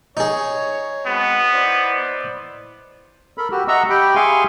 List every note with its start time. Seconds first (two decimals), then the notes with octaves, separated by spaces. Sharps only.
0.17 D#4 G#4 C#5
1.06 G#3 B3 C4 F#4
1.54 E4 C5 D5
3.38 A4 A#4 B5
3.51 F#4 G4
3.68 D#5 E5 F#5 A#5 C#6 E6
3.90 G4 G5 B5
4.16 G#4 E5 F5 G#5 C6 C#6